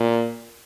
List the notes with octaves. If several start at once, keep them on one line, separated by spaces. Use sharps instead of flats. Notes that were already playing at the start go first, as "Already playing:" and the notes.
Already playing: A#2